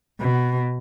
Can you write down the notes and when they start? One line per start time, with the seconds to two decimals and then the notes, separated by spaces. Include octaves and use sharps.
0.21 B2